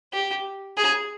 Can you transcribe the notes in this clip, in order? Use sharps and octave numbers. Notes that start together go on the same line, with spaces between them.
G4
G#4